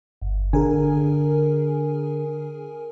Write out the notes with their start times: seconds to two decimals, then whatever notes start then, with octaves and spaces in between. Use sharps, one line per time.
0.22 G1
0.53 D3 G#4 A#4 G#5